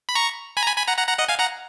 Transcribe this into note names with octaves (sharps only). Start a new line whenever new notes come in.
B5
A#5 C#6
G#5 B5
A#5
G#5 B5
G#5 B5
F#5 A#5
F#5 A#5
F#5 A#5
D#5 F#5
F5 G#5
F#5 A#5